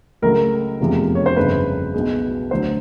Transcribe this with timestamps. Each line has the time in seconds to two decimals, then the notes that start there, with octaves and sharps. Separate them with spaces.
0.22 C#2 C#3 F#3 A3 A#4
0.80 F1 E2 C3 F3 G#3
1.15 C#5
1.26 C5
1.36 G1 F2 C#3 F#3 B4
1.94 B1 B2 G#3
2.51 D2 D3 F#3 C5